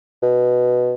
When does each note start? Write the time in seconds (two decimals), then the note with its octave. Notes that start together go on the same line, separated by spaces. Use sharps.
0.23 B2